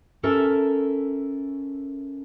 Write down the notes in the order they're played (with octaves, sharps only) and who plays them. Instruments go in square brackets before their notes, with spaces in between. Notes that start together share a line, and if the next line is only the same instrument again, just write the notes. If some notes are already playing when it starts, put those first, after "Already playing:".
[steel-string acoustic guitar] C#4 A4 A#4 E5